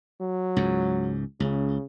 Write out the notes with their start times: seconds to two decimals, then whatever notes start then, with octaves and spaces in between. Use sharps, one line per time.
0.21 F#3
0.56 C#2 G#2
1.40 C#2 C#3